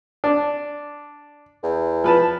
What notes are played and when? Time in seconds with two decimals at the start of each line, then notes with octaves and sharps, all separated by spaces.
0.24 D4
1.63 E2
2.04 F3 B4 A5